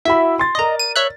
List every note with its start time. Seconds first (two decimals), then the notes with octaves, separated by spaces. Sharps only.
0.05 E4 F#4 E5 B5
0.39 C6 A6
0.55 A#4 D5 D#5 A#5
0.79 D#7
0.96 C#5 E5 F#6